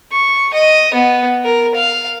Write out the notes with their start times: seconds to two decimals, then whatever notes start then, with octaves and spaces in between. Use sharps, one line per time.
0.12 C#6
0.54 D#5
0.94 B3
1.45 A#4
1.75 F5